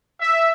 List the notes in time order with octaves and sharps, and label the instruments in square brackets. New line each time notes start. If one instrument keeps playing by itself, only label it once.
[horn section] E5